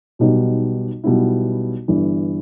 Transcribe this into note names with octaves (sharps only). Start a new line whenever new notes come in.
B1 B2 G3 D#4
B1 B2 G3 B3 E4
G1 G2 E3